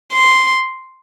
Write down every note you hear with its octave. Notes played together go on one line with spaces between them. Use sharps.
C6